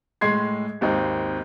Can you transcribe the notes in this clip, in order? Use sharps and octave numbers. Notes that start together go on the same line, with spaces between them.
A2 G#3 C6 G#6 C7
G#1 D#2 C4 D#4